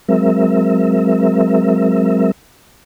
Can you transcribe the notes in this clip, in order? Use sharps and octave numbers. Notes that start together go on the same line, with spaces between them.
F#3 G#3 C4 A#4 E5